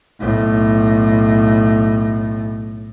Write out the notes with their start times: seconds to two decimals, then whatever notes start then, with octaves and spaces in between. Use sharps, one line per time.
0.20 B1 A2